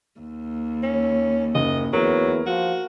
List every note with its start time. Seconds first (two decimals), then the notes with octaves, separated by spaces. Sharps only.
0.19 D#2
0.83 C#4
1.55 F#1 D#5
1.93 E2 F#3 A#4
2.46 F3 F#4